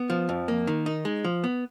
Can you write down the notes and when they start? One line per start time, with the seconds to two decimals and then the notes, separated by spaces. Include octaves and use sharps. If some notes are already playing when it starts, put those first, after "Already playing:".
Already playing: B3
0.10 F3
0.29 F2
0.48 A#3
0.67 D#3
0.86 D#4
1.05 G#3
1.24 F3
1.44 B3